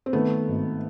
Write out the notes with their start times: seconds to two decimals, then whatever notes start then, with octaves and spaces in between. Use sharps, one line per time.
0.06 C4
0.13 D#3 A3 B3
0.48 G#1